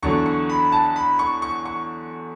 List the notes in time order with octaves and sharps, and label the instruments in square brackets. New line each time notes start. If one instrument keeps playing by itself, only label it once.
[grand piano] E2 D3 F#3 C#6
C#6
B5
A5
B5
C#6
C#6
C#6